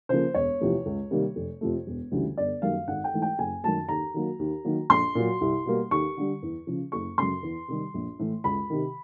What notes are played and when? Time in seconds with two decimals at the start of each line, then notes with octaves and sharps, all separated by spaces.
0.09 C#3 F3 A#3 C5
0.34 E1 C#5
0.60 E2 C3 F3 A3
0.86 C#2
1.11 C3 D#3 G3 A#3
1.36 F1
1.61 F2 C3 F3 A3
1.87 E1
2.12 D2 C#3 E3 G3
2.37 G1 D5
2.62 F#2 D#3 G3 A#3 F5
2.88 G#1 F#5
3.04 G5
3.13 G#2 E3 A3
3.22 G5
3.39 F#1 G#5
3.63 F#2 D#3 F#3 A3 A5
3.89 D#2 A#5
4.14 D#3 F#3 A#3
4.39 D#2
4.65 D#3 F#3 A#3
4.90 A#1 C6
5.15 A#2 F#3
5.41 C2
5.66 B2 G3 A#3
5.91 D#2 C#6
6.17 D3 G3
6.42 E2
6.67 C#3 F3
6.92 F#1 C#6
7.18 F#2 C#3 C6
7.43 E2
7.68 C3 D#3 G3
7.94 A#1
8.19 A2 E3 A3
8.44 C#2 B5
8.70 C3 D#3